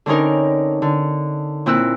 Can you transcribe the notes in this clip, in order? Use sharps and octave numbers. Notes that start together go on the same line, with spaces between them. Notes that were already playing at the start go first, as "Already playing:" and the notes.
D3 C4 C#4 D#4 A#4
D3
A#2 C4 E4 E6 F#6